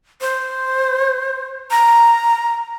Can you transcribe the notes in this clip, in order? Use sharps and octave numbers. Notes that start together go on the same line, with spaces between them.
C5
A#5